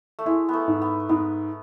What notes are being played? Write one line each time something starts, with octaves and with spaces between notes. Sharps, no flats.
A3
G#3 E4
A3 B3
G#2
B3
G#2 B3